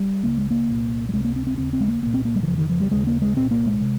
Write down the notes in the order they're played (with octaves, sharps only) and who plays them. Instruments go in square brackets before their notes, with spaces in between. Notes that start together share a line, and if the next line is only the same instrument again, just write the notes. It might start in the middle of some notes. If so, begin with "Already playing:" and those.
Already playing: [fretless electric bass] G3
C#2 C#3 A#3
G#3
A#3
C2 A#2
G3
C#2 C3 G#3
A#3
C4
C4
D#2 C#3 C4
C4
G#3
A#3
C2 A#2 A#3
C4
A#3
G3
D#3
F2 C#3 F3
D#3
F3
G3
D#2 C#3 G#3
A#3
G#3
C2 A#2 C4
A#3
G#3
C3